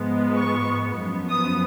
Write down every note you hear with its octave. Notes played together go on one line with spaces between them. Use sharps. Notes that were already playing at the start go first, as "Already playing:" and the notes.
Already playing: G#2 F3 G#3 B3
C#6
F#2 F3 B3
D#6